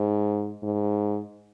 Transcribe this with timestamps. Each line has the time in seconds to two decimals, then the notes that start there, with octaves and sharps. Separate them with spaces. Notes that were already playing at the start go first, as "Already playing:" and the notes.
Already playing: G#2
0.63 G#2